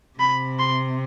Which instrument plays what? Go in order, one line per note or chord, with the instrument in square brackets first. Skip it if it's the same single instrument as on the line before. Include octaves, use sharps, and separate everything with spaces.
[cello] C3 [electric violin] B5
[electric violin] C6